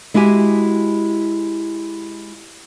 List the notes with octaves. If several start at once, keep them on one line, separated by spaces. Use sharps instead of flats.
G#3 E4 F#4 G4 G#5